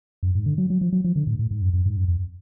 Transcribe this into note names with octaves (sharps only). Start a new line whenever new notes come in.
F#2
G#2
D3
F#3
F#3
F3
F#3
F3
D3
A2
A2
G#2
F#2
F#2
G#2
F#2
F2